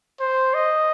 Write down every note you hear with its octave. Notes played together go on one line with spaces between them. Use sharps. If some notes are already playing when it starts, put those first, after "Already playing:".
C5
D#5